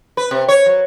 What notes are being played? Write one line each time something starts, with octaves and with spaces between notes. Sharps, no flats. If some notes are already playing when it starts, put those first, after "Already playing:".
B4
C3
C#5
F#3